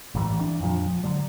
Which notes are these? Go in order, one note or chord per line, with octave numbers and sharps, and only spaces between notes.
A1 A2 E3 G3
E3 D4
F2 A#2 D#3 F3
F3
D3 F#3 G3